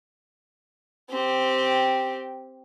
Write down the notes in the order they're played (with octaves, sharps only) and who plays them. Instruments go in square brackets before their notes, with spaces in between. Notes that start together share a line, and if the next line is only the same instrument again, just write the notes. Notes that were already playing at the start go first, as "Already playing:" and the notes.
[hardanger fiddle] C4 G4